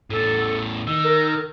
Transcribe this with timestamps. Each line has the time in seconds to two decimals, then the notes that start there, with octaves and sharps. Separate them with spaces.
0.11 E2 A2 A4
0.87 D#3 E6
1.04 A#4